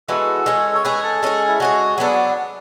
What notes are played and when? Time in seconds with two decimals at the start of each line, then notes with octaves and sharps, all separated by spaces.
0.08 E3 G#3 B3 F#4 A4
0.46 G#3 C#4 G#4
0.74 C#5
0.84 G#3 C#4 G#4 B4
1.03 A4
1.23 G#3 C#4 G#4
1.48 E4
1.60 G#3 C#4 F#4 G#4
1.98 F#3 B3 D4 A4
2.07 G#4